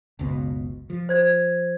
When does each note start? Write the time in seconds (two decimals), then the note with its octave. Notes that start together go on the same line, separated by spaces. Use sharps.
0.19 F#1 C#2 B2
0.90 F3
1.09 C5 G#6